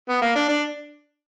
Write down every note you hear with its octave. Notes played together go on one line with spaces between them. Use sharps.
B3
A#3
D4
D4